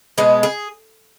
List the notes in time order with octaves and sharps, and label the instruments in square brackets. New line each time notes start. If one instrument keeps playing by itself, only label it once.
[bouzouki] B2 G#3 B3 G#4
G#4